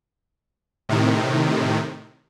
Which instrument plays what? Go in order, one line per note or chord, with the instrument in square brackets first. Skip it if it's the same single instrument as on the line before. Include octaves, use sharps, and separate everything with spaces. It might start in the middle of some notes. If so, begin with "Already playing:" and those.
[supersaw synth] A2 C3 D#3